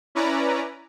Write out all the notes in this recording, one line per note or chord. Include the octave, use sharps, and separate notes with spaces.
C#4 E4 B4 D5 A#5